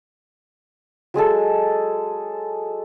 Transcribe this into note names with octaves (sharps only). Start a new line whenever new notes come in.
F#3 G#3 G#4 A4